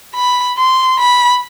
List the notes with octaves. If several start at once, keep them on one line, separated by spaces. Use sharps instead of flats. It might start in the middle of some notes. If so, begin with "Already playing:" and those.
B5
C6
B5